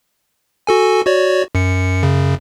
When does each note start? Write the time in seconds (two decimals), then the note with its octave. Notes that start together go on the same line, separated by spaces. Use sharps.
0.67 F#4 A4 G#5
1.06 F#4 C#5 D5
1.55 F#2 C#7
2.03 F#2 C#3